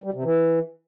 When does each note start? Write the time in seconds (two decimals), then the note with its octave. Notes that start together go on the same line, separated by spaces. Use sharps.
0.04 G3
0.14 C3
0.24 E3